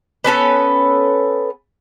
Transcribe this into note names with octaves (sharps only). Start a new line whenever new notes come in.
B3 C#4 A4 B4